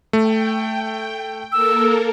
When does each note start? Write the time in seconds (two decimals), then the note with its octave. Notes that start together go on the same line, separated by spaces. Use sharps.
0.13 A3 G5
1.52 A#3 A4 A#4 E6